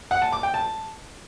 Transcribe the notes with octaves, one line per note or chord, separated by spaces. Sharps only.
F#5
A5
D6
G5
A5